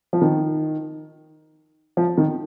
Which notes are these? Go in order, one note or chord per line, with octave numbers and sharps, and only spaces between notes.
F3
D#3
F3
D#3